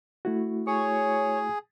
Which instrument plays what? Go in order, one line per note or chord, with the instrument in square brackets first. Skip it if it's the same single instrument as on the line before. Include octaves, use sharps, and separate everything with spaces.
[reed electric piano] A3 E4 F#4
[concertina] G#4 [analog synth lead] C#5